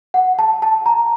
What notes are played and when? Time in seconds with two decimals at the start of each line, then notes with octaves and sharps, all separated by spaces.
0.14 F#5
0.39 A5
0.62 A5
0.86 A#5